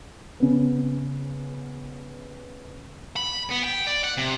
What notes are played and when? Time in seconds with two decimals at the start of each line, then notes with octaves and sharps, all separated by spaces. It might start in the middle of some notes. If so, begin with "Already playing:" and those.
0.40 C#3 B3
3.16 B5
3.50 B3
3.63 G5
3.87 D5
4.03 F#5
4.17 C3